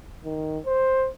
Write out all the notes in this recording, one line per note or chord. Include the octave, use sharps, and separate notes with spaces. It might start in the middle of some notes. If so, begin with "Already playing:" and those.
D#3
C5